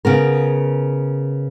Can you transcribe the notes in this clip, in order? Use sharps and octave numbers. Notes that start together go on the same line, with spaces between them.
C#3 B3 A#4